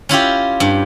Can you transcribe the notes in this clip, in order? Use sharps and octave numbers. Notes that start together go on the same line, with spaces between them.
C#4 E4 F4 G4
G2